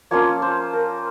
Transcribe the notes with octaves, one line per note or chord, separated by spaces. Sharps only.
F3 A#3 C#4 F4 C#5
C5
A#4